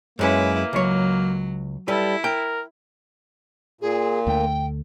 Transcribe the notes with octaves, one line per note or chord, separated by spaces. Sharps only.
F#2 G#3 A#3 C#4 E4 B4
C#2 F#3 C#5
G3 E4 A4 B4
A#4 G5
A#2 G#4
D2 D3 A3 G5